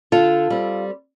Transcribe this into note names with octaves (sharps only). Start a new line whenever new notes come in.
D3 F4 A4
G3 C4